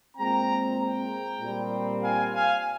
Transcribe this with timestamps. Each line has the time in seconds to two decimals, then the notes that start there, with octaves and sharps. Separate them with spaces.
0.16 A#2 G#3 C4 G5 A#5
0.78 G5 A#5
1.40 A#2 G3 C4
2.02 F5 G#5
2.33 F5 G#5